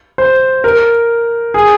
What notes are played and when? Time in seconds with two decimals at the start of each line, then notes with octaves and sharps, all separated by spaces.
0.18 C5
0.64 A#4
1.54 G#4